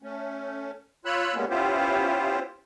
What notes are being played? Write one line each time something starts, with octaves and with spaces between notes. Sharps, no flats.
A3 C#4
F4 C#5 B5 E6 F#6
G3 G#3 A#3 B3 C#4
B3 C#4 E4 F4 G4 C5